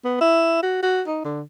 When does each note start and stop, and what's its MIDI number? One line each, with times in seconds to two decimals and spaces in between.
0.05 0.18 59
0.21 0.60 64
0.63 0.78 66
0.83 1.02 66
1.07 1.22 63
1.25 1.42 50